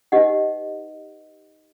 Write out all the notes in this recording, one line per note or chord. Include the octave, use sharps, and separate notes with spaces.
D#4 G4 B4 D#5 F#5